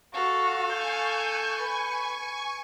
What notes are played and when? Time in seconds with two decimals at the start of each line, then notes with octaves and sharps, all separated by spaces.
0.14 F#4 A4 F5
0.73 G#5 C#6 G6
1.60 B4